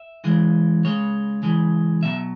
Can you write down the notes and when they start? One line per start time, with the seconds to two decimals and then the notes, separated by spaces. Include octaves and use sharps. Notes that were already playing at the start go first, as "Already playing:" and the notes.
Already playing: E5
0.24 C#3 E3 G#3
0.84 C#3 G#3 C#5
1.43 C#3 E3 G#3
2.03 B2 F#3 E5